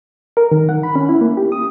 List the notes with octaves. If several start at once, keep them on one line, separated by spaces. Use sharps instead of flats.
A#4
D#3
F#5
B5
C#4
E4
A#3
G4
D#6